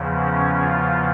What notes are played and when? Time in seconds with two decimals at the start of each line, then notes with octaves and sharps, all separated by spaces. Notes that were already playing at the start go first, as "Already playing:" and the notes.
Already playing: E2 C#3 F3
0.22 C#4
0.62 F4